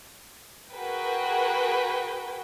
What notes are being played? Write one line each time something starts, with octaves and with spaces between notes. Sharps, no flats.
F#4 G#4 A#4 B4 G5